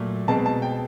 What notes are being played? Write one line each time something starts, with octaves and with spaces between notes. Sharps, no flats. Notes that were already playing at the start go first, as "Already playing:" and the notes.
Already playing: A#2 F#3 A3
B2 G#3 C4 A5
A5
G5